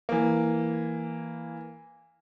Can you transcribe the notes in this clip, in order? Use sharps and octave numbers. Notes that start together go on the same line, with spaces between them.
E3 A#3